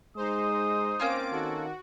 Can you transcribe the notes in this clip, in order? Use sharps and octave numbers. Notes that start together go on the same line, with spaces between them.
G#3 D#4 C5 D#6
A#3 C4 C#4 F4 D6 D7
D#3 F#4 A4